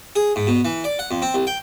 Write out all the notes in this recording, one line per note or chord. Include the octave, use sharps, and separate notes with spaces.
G#4
G#2
B2
E3
D5
F#5
F2
C4
C2
G5